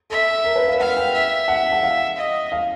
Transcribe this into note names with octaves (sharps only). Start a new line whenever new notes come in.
A4 E5
A#4
B4
F5
F5 F#5
G5
E5
F#5
F#5
F5
D#5
F5